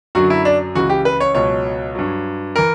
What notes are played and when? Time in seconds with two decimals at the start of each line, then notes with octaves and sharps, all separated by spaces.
0.15 F#2 D3 F#3 F#4
0.30 E4
0.45 D4
0.75 C#2 C#3 E3 F#4
0.89 G4
1.05 B4
1.20 C#5
1.35 C#2 B2 F#3 C#5
1.95 G2 F#3
2.56 E3 A#4